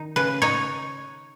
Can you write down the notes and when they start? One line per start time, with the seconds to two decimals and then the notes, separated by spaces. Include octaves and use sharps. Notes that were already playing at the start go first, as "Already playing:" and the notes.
Already playing: D#3 D#4
0.16 C#3 B4
0.42 D#4 C#5